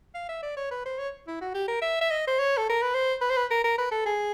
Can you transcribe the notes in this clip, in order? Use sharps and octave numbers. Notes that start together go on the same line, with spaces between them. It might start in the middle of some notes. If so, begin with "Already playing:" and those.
F5
E5
D5
C#5
B4
C5
C#5
E4
F#4
G4
A#4
E5
E5
D#5
C5
C#5
A4
A#4
B4
C5
B4
C5
B4
A#4
A#4
B4
A4
G#4